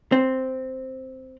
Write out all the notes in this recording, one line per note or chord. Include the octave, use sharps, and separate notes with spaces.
C4